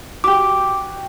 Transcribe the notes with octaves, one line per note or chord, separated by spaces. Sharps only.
F#4 G4 D6